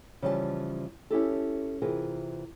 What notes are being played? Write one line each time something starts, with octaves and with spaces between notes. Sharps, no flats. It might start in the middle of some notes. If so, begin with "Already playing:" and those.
C#3 E3 F3 G3 D#5 A5
C#4 E4 G4 A4
C3 E3 F4 G#4 A#4